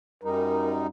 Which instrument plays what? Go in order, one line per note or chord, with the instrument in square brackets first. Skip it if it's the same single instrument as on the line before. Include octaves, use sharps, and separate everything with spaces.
[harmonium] F#2 G3 D#4 [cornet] A#4